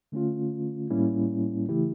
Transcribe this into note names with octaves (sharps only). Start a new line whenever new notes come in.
D3 A3 C#4 F4
A2 G3 A#3 C#4 E4
C#3 E3 A3 E4 G4